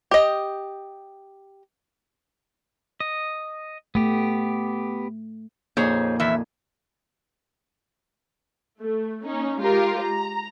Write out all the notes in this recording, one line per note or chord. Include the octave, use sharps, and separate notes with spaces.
G4 D#5
D#5
A3 B3 G4
F2 A#2 D#4 G#4 C5 C#5
E2 E5
A3
A#3 C#4 D#4
G#3 F4 G4 A#4
A#5